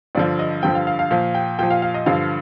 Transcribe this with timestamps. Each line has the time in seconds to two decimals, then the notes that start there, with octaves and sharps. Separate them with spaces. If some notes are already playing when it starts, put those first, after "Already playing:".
0.15 G2 D3 F3 D5
0.39 D#5
0.63 G2 D3 F3 G5
0.75 F5
0.87 F5
0.99 F5
1.11 A#2 F3 F5
1.35 G5
1.59 A#2 F3 G5
1.70 F5
1.82 F5
1.94 D#5
2.06 G2 D3 F3 F5